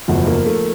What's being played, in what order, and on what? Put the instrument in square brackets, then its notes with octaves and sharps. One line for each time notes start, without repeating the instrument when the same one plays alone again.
[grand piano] F#1 E2 B2 F#3 A3 [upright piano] F3
[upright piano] A#3
A3